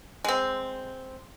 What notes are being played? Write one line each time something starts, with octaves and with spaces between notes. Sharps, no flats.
G#3 C4